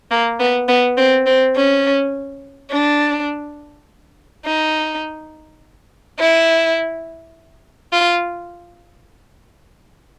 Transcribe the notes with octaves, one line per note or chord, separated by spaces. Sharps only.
A#3
B3
B3
C4
C4
C#4
D4
D#4
E4
F4